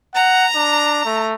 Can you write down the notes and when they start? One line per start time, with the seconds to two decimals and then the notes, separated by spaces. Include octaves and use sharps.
0.15 F#5 A#5
0.56 D4
1.05 A3